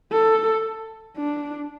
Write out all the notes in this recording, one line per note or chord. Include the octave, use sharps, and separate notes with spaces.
A4
D4